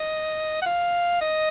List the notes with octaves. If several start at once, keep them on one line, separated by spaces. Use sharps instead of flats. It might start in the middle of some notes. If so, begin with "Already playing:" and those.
Already playing: D#5
F#5
F5
D#5